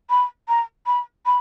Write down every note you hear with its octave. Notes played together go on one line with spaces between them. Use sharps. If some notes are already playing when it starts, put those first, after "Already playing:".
B5
A#5
B5
B5